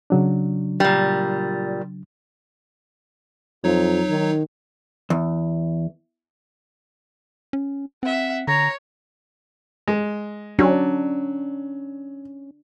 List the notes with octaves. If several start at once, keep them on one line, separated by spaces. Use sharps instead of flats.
C#3 F#3 D4
A#2 G3
F2 F#3 D#4 C#5
D#3
E2
C#4
C4 E5 F#5
D3 C#5 A#5
G#3
F#3 C#4 D4